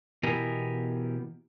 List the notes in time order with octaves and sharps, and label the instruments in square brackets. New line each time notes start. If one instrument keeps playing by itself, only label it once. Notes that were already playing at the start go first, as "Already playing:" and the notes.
[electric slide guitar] B2 E3 B3 G4 A#4 G#5